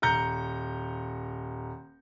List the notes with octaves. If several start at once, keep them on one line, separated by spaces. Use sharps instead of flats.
D#1 A#5 G6 C#7